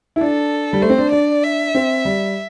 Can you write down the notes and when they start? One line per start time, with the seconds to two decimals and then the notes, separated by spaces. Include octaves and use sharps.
0.16 E4
0.21 D4 A4
0.73 G3
0.82 A3 C5
0.90 C4
0.98 D4
1.12 D4 D5
1.43 E5
1.75 C4
2.05 G3